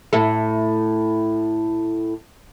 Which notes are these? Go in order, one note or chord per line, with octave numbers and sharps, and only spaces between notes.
A2 E4 A4